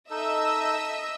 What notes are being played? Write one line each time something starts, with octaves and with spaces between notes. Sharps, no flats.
D#4 A4 D#5 E5 E6